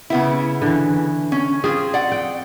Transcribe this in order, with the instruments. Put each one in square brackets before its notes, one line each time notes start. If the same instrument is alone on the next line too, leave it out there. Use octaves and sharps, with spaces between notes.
[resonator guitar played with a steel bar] C#3 B3 E4
[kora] D3 E3
[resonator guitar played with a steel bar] C#4
[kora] C4 F4 [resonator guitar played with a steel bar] G#4
[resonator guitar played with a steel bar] D5 F#5
[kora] G5